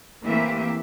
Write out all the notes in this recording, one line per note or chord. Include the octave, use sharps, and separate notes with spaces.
E3 A3 A#3 C4 G4 E5